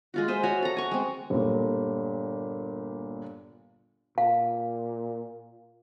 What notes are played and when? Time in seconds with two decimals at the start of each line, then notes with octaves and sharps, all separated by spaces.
0.14 G#3 F4 F#4
0.28 C5 D#5 E5
0.43 F#4 C#5
0.62 A4 A#5
0.77 G#5 C#6
0.91 G#3 C4
1.30 G1 A#2
4.18 A#2 F5